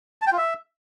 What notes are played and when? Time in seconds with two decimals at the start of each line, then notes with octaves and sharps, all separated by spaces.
0.22 A5
0.27 G5
0.32 F4
0.37 E5